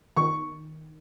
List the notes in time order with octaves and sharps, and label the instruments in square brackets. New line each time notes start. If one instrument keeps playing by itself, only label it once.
[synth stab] D#3 [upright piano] C#6